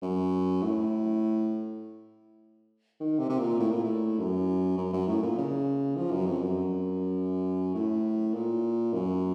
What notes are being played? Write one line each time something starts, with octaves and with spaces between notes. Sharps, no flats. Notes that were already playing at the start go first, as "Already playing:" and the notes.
F#2
A2
D#3
C3
C3
A#2
A2
A#2
A2
F#2
F#2
F#2
A2
A#2
C#3
F3
F#2
F2
F#2
A2
A#2
F#2